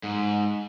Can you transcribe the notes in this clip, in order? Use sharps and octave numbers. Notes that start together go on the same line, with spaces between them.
G#2